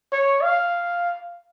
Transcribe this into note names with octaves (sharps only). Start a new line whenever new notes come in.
C#5
F5